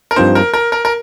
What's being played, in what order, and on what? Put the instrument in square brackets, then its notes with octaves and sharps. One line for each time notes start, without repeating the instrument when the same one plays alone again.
[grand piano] A#4
[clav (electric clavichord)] G2 F3 C4 D#4 [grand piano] C5
[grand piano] A#4
A#4
A#4
A#4